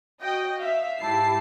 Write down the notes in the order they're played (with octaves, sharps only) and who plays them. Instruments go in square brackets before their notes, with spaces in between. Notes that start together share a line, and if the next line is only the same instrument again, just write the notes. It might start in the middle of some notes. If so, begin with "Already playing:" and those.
[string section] F#4 D#5 G5
E5 F5
G#2 E4 G4 A5 C7